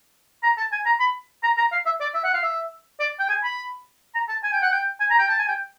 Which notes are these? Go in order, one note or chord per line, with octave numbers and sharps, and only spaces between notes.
A#5
A5
G#5
A#5
B5
A#5
A#5
F5
E5
D5
E5
F#5
F5
E5
D5
G5
G#5
B5
A#5
A5
G#5
G5
F#5
G5
G#5
A#5
G5
A5
G#5
G5